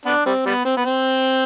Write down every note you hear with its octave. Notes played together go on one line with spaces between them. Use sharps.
B3 D4
G3 C4
G3 B3
C4
B3
C4